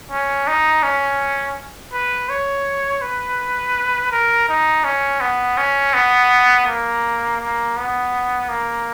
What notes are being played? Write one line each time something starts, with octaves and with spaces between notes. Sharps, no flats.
C#4
D#4
C#4
B4
C#5
B4
A#4
D#4
C#4
B3
C#4
B3
A#3
A#3
B3
A#3